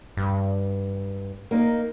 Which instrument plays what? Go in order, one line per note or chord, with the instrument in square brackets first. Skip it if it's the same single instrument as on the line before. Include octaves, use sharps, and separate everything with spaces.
[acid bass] G2
[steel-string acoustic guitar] A#3 D#4